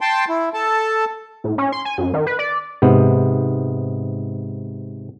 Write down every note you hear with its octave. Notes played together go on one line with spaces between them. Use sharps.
G5 A5 C6
E4
A4 A5
A2
C#4
C6
G#5
F#2
D#3
B4
D5
G#2 C3 B3